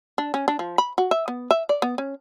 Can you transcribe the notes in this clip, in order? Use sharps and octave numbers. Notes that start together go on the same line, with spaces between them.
D4
C#4
D4
F3
B5
F#4
E5
B3
E5
D5
B3
C#4